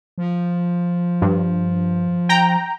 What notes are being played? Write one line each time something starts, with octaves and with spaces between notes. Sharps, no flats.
F3
G2
G5 A#5